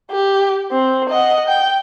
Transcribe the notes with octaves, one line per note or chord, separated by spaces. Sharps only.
G4
C4
D#5 F#5
G5